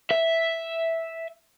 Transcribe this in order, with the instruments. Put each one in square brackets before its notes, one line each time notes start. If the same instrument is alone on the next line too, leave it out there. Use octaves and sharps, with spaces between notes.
[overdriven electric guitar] E5